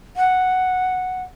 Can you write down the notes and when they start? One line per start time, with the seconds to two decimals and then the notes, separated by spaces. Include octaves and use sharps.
0.17 F#5